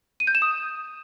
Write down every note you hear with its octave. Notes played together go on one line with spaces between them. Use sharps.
D#7
G6
E7
D#6